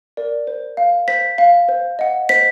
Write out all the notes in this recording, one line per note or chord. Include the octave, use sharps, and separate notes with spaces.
A#4 D5
C5
F5
C5 B6
F5
C5
D#5 F#5
C5 B6